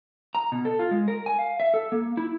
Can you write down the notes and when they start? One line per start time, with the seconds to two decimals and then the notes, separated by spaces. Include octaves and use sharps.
0.35 A#5
0.52 B2
0.65 A4
0.79 F4
0.91 G#3
1.08 A#4
1.26 G#5
1.39 F5
1.60 E5
1.74 A4
1.92 A#3
2.17 E4